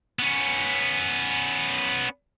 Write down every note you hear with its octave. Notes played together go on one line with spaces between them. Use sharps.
B3 C#4